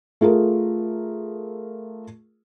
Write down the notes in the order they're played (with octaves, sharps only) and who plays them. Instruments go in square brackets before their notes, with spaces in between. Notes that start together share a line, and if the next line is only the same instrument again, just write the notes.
[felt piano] A3 F4 G#4 A#4